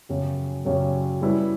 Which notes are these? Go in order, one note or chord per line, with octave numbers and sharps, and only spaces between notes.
F#2 C#3 F#3 C#4 G4
F#2 C#3 F#3 C#4 G4
G3 C#4 E4 B4